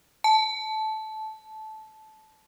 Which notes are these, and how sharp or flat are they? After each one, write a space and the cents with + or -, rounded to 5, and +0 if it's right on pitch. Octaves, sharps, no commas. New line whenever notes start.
A5 -15